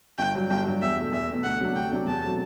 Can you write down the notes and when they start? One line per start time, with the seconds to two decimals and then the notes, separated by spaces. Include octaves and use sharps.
0.18 G1 G5
0.35 G2 F#3
0.50 G1 G5
0.66 G2 F#3
0.82 E2 E5
0.97 B2 A3
1.12 E2 E5
1.29 B2 A3
1.44 D2 F#5
1.60 C3 F#3 A3 D4
1.75 D2 G5
1.91 C3 F#3 A3 D4
2.07 E2 A5
2.23 B2 F#3 A3 C4